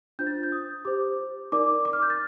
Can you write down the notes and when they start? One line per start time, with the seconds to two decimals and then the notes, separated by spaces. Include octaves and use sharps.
0.19 D4 F4 C5 G6
0.27 A6
0.43 G6
0.52 D#6
0.85 G4 C5 D6
1.52 D#4 A#4 D5 D6
1.85 D6
1.93 F6
2.02 G6
2.10 A6